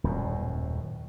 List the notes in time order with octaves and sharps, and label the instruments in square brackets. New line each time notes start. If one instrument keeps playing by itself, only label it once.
[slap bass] D#1 F#2 A2